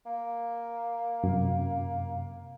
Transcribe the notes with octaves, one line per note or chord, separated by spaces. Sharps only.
A#3
F#2 C3